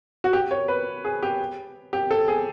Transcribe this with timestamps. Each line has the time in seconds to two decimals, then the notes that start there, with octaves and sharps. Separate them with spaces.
0.24 F#4
0.33 G4
0.51 C#5
0.68 B4
1.05 G#4
1.23 G4
1.93 G4
2.11 A4
2.28 G#4